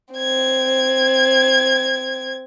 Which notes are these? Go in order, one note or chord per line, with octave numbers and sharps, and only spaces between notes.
C4 G#6